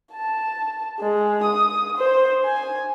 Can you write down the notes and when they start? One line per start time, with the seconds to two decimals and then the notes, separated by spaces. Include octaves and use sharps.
0.13 A5
1.00 G#3
1.44 D#6
1.97 C5
2.45 G#5